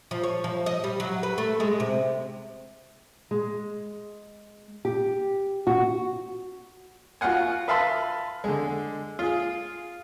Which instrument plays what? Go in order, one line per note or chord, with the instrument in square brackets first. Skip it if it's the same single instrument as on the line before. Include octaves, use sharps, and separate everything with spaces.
[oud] F3
C#5
F3
D#5
G3
F#3
B4
A3
G#3
C3
[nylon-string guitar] G#3
G4
F#4
[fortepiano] F4 F#4 F5 F#5 G#5
B4 E5 F5 A5 B5 C6
D3 G#3
F4 G#4